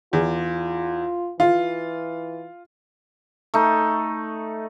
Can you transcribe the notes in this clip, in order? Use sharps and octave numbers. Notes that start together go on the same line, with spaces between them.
E2 F4
E3 F4
A3 D#4